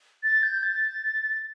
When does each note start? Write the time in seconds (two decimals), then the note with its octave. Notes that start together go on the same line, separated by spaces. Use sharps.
0.23 A6
0.43 G6
0.63 A6